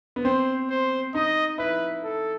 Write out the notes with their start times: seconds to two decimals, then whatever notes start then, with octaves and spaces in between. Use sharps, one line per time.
0.16 B3
0.24 C4 C5
0.70 C5
1.14 D#4 D#5
1.58 E4 B4
2.04 A4